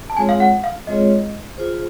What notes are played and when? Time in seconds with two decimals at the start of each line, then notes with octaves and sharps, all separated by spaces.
0.10 A5
0.17 G#3 C4 F4 G#4 C#5 G#5
0.29 F5
0.40 F#5
0.64 F5
0.87 G#3 C4 F4 G#4 C#5 D#5
1.58 F4 G#4 C5